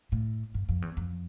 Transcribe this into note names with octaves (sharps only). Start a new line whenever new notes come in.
A2
G2
F2
E2
F2